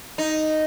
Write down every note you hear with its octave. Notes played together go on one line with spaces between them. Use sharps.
D#4